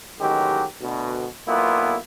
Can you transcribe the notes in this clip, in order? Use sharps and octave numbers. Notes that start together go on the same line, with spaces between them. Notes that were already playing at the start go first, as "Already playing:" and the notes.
A1 D#3 F#3 G#3 G4
D2 B2
B1 A#3 B3 E4 F4